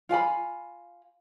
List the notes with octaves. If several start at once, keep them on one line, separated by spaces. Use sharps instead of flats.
F4 F5 G#5 B5